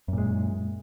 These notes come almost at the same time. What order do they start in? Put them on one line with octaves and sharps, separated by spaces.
F#2 A#2 G#3